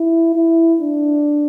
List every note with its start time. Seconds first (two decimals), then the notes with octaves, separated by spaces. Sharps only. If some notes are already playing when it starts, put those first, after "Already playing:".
Already playing: E4
0.36 E4
0.81 D4